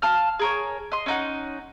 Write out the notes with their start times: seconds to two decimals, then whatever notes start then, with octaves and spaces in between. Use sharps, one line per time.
0.02 F5 A5 F6
0.39 G#4 A#4 C#5
0.92 D#5 C6
1.06 C#4 D#4 F#5